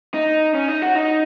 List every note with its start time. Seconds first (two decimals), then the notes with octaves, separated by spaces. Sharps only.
0.14 D#4
0.55 C#4
0.68 D#4
0.82 F#4
0.95 D#4